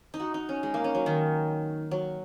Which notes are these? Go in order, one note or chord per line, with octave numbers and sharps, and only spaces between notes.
D#4
F#4
D#4
C#4
G#3
A#3
C#4
F#3
D#3
F#3